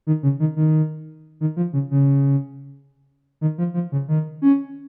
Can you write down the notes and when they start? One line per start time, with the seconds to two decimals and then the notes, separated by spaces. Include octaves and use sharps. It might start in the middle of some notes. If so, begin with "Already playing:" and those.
0.07 D#3
0.23 C#3
0.40 D#3
0.56 D#3
1.41 D#3
1.56 F3
1.73 C#3
1.91 C#3
3.41 D#3
3.58 F3
3.74 F3
3.92 C#3
4.08 D#3
4.42 C#4